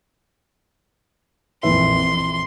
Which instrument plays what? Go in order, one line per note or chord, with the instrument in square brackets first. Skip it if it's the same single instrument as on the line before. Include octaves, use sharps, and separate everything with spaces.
[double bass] A#1 F2 [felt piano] E3 B4 E5 [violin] C6